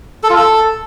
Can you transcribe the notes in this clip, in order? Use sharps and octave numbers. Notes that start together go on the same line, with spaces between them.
A4
F4
A4